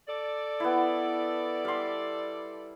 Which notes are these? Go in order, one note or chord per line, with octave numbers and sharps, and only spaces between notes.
A4 D5
B3 E4
G3 C6